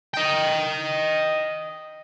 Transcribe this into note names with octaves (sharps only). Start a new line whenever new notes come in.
D#5 G5